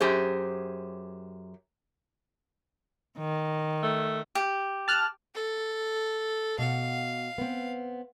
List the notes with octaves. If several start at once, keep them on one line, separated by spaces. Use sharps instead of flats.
F#2 G4 G#4 C5
D#3
A3
G4
A5 F6 F#6
A4
B2 F5 F#5
B3 C4